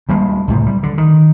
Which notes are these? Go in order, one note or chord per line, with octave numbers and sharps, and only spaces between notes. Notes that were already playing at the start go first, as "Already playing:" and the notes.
D2 G3 G#3 A#3
C#2 A2 C3
G3
D3
D#3